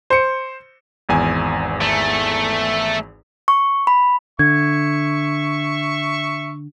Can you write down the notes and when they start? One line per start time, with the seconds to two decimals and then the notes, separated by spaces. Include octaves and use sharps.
0.10 C5 C#7
1.09 G#1 E2 G#5
1.81 A3
3.48 C#6
3.87 B5
4.39 D3 E5 C#6 G#6